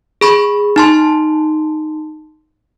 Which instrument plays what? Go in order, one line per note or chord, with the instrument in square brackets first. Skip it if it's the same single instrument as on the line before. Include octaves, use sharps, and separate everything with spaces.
[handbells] G#4 B5 C#6
D#4 A5 C6